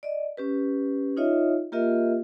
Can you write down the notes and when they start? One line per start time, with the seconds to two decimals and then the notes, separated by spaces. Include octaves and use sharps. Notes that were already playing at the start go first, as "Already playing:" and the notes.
0.03 D5 D#5
0.37 C#4 G4 B4
1.17 D#4 F4 C#5 D#5 E5
1.72 A#3 F4 G4 A#4 D#5 E5